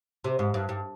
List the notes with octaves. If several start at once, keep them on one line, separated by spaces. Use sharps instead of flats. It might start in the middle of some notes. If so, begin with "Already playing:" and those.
C3
G#2
G2
G2